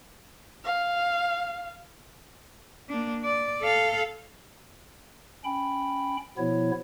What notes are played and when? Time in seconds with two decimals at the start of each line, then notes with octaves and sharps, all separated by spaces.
0.64 F5
2.89 A#3 D4
3.24 D5
3.61 A4 F5
5.45 C#4 G5 B5
6.38 B2 F3 B3 E4 C#5